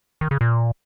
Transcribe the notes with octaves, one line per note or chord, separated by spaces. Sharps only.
D#3
C#3
A#2